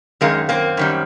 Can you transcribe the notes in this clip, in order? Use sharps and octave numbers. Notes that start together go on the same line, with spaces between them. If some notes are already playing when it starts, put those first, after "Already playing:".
F#2 D#3 G#3 A#3
A#3 C4
F#2 D#3 G3